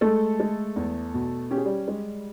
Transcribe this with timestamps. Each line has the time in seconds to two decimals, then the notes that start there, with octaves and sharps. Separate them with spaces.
0.01 G#3 A3 A4
0.40 G#3
0.76 E2
1.14 B2
1.51 C#4 G4
1.58 G#4
1.65 G3 G4
1.88 G#3